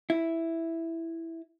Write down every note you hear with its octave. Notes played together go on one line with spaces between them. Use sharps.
E4